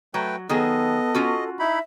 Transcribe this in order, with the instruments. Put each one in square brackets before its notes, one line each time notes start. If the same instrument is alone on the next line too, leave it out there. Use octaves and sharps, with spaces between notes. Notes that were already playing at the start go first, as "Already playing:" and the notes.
[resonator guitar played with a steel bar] F#3 [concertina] A3 B4 G5
[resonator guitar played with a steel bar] D#3 F#3 G#4 [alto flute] B3 [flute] A4 [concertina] D#5
[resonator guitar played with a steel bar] C#4 F4 F#4
[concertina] D#4 E4 B5 [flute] E5